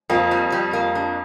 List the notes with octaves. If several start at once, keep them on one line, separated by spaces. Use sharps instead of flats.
F2 A#3
G3
G3
A#3
D4